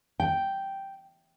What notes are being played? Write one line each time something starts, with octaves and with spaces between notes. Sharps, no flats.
G5